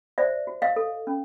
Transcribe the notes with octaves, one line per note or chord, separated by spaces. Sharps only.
C5 D5 E5
F#4
D#5 F5
A4
C#4